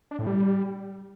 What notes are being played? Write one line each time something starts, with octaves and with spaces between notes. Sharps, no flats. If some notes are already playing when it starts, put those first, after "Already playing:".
D4
A2
G3